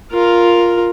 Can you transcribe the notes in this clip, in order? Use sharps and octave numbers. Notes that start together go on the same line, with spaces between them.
F4 A#4